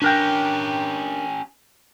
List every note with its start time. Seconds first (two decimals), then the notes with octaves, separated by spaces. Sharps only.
0.02 C#4 D4 G4 A#4 G5